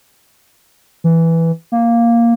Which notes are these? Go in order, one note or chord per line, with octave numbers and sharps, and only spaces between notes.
E3
A#3